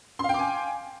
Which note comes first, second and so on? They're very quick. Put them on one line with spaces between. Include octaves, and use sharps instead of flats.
C6 F5 G5 D6 G#5